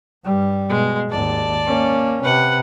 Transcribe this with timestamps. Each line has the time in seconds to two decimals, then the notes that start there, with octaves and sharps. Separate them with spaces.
0.24 G2 G3
0.69 B2 G#3
1.10 G#1 D#2 D5 A5
1.66 A#3 C#4
2.23 C3 B4 F#5